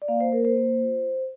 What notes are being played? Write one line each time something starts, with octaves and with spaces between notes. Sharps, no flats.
D5
A#3 F5
C5
A#3 A#4
C5
A#3
F4